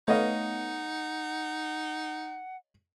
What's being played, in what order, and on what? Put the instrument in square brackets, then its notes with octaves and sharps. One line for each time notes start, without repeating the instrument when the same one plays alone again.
[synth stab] A3 B3 [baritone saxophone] D#4 [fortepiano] C#5 D#5 F5 [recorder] F#5